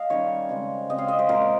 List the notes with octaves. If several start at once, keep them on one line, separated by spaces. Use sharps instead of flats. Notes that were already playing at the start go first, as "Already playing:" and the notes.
Already playing: D#5 F5
D#3 G3 C#4 C#5
C#3 G#3 C4
C#3 G#3 C4 D#5
F5
D#5
C5
A#2 G#3 C4 A#4